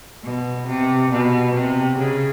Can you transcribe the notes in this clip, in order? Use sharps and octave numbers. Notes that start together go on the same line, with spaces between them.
B2
C3
B2
C3
C#3